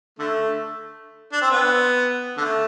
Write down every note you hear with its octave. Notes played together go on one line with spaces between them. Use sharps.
D3 A3
D4
C4
B3
D3 A3